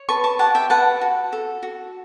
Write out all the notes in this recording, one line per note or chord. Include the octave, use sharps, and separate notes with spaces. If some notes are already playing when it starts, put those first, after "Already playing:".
Already playing: C#5
B4 A5 C#6
A5 C#6
G4 F#5 A5
E5 G5
B4 F#5 A5
F#4
A4
F#4